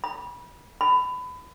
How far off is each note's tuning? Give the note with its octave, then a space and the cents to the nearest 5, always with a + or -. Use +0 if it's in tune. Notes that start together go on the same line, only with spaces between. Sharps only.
B5 -30
B5 +25